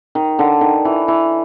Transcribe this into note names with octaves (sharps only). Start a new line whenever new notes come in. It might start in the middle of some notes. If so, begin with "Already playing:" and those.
D#3
D3
D#3
E3
E3